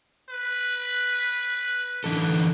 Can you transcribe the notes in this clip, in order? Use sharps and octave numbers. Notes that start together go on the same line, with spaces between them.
B4
D3 E3 A4